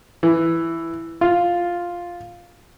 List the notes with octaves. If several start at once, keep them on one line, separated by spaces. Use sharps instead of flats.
E3
F4